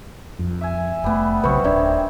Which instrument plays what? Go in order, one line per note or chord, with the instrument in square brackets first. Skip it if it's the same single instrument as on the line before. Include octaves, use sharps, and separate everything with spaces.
[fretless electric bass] F2
[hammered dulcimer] E5 G#5
[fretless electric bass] F1 A3 [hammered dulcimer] G3 B3
[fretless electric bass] B1 C#3 F#3 [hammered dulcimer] C4 [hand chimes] B4 C#6
[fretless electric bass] D1 [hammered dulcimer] D#3 [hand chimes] D4 D5 E5